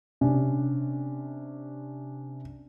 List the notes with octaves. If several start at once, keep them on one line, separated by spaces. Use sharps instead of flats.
C3 C#4 D4